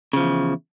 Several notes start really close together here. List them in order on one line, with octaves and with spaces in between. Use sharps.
C#3 F3 E2